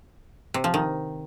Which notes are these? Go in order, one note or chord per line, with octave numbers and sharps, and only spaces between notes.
C3
F3
D#3